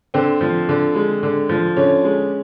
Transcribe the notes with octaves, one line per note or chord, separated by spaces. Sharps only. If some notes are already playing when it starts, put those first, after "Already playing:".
D3 C4
F3
D3
G#3
D3
F3
D3 C#4
G#3